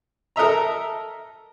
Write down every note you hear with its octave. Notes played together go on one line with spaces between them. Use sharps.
A4 A#4 D#5 E5 A#5